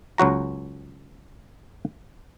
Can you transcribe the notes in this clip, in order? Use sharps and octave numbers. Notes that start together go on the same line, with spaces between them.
C#2 F#3 F#4 A#5